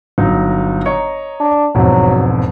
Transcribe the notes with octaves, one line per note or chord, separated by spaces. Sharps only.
G1 F#3 D#4
C#5 D#5 A#5
D4
E1 F2 G#2 F#3